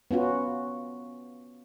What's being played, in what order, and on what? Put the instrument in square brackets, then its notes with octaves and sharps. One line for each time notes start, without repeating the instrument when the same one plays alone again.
[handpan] B3 C#4 F4 F#4